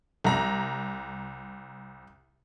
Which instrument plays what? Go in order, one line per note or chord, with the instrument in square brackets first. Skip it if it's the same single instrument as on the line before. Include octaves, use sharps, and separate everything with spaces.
[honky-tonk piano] C2 A#5